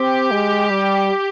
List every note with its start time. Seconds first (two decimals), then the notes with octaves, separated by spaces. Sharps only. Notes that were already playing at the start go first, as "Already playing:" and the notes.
Already playing: C4 G4
0.31 G#3
0.70 G3